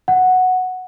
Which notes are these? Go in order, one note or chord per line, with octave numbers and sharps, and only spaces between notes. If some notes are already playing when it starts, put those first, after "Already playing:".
F#5